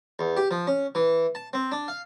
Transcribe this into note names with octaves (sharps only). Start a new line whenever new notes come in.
E2
G4
F3
C#4
E3
A5
C4
D4
F5